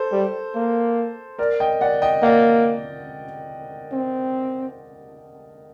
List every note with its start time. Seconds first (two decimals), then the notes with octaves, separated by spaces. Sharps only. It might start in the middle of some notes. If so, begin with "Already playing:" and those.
Already playing: A4 C5
0.12 G3
0.55 A#3
1.39 A#4 D5
1.60 D#5 G5
1.81 D5 F#5
2.02 D#5 G5
2.23 A#3 D5 F#5
3.92 C4